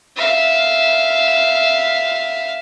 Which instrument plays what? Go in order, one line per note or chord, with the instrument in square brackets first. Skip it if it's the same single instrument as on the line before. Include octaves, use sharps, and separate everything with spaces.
[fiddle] E5 F5